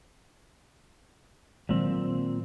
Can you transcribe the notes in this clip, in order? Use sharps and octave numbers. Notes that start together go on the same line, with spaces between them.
A#2 D#3 F#3 G#3 C4